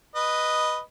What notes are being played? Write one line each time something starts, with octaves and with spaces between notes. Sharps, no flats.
B4 D#5